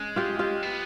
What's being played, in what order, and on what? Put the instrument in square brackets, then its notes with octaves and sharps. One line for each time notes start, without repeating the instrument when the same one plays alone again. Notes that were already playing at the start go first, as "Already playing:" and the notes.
Already playing: [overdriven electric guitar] G#3 [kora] C#4
[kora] F4 G4
F4 G4
[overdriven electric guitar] B3